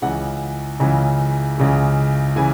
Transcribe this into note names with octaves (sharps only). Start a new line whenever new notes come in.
C#2 C#3 E3 F#5
C#2 C#3 E3
C#2 C#3 E3
C#3 E3 G#5